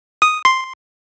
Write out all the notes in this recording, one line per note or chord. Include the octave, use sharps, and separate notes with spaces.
D#6
C6